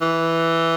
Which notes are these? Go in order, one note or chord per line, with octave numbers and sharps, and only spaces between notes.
E3